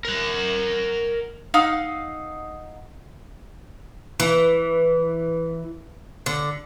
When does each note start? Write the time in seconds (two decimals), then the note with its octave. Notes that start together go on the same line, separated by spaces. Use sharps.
0.05 A#4 F#5
1.54 D#4 F5 F#5 E6
4.20 E3
6.26 D3